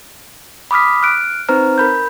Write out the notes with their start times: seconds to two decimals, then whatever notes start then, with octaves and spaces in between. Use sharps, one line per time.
0.71 B5 D6 D#6 F6 B6
1.03 F6 F#6 D7
1.49 C4 D#4 B4 C5 A#5 F6
1.78 A#4 B5 G6